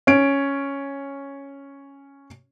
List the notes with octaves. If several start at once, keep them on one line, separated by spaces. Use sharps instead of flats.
C#4 D7